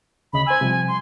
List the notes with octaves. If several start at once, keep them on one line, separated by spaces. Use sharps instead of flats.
D2 C#3 D#5 B5
C5 G#5 E6
C3 F3 G3
C6